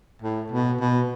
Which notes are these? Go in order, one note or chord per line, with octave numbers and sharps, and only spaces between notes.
A2
B2
B2